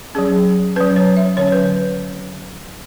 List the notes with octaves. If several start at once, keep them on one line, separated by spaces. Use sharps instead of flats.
F#3 C#4 G#4
F#3 C#4 B4
C#5
E5
D3 F#3 C#4 C#5
B4